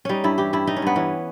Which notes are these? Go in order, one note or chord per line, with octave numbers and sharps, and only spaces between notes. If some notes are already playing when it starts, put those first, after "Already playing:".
G3 C#4 D#4
G2 E4
E3 G4
G2 E4
G3 D#4
C#4
G2 B3
E3 C#4